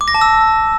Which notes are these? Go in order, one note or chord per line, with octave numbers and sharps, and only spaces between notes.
D6
A#6
A5
E6